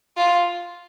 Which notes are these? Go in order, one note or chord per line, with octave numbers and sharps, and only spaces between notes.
F4